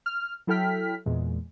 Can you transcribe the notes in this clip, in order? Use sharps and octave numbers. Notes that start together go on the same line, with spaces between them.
F6
F#3 E4 A4 G5 F6 B6
E2 A#2 G#3